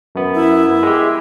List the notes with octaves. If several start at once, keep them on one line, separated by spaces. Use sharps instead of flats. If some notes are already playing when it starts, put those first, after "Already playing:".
F#2 B3
E4
G#3 G4